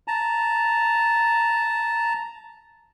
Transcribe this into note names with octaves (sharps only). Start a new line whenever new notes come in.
A5 A#5